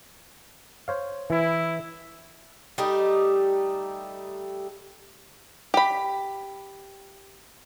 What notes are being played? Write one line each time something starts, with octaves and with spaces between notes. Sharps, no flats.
C5 C#5 F5
E3 E4
G3 A3 D#4 G4
G4 B5